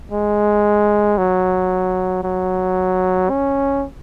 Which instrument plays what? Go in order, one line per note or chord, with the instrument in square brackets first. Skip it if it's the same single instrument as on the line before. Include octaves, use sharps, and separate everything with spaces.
[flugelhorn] G#3
F#3
F#3
C#4